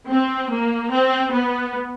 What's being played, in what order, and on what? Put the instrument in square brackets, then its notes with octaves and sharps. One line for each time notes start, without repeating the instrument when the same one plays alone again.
[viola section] C4
A#3
C4
B3